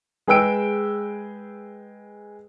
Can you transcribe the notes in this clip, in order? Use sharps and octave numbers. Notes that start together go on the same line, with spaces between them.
G#3 G#4 B4 G5 E6 D7